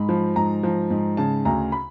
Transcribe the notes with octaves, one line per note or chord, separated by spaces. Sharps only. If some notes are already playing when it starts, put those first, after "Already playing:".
Already playing: G#2 B5
F3
G#2 A#5
F3
G#2
C#3 A5
D2 A#5
B5